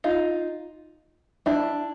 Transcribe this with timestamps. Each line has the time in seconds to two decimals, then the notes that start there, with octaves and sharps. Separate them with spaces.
0.04 D#4 F4
1.46 D4 E4